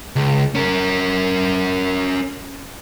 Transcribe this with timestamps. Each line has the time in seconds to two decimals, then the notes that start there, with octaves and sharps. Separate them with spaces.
0.16 C#2
0.55 C#4 A#4